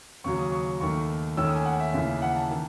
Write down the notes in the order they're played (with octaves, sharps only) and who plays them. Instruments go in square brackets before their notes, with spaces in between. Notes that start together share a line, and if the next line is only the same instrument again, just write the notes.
[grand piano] D#2 C#3 F#3 C#6
D#6
C#6
D#2 D#3 A3 C#6
D#2 D#3 A3 C#4 E6
D#6
G#5
F#5
E5
D#2 C#3 E3
F#5
A5
D#3